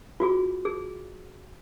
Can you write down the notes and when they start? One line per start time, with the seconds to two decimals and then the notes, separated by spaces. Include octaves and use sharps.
0.20 F4 F#4 G#4
0.65 G#4